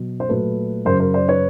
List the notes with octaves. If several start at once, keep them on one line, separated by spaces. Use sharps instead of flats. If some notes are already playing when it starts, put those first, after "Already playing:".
Already playing: B2 F#3
C5
A#2 F#3 A3 A4 B4
F#2 C#3 F#3 A#4 C5
A#4 C5
C5 D5
B4 C#5